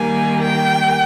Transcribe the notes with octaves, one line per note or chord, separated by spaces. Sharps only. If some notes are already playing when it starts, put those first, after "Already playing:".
Already playing: D#3 G3 A#3 G#5
G5